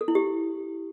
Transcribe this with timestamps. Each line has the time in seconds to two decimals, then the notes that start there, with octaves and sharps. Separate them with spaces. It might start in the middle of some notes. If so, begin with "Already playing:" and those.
0.01 A4
0.08 E4
0.15 G4